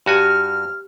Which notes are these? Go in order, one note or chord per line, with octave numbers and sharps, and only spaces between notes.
G2 F#4 G4 G#5 F6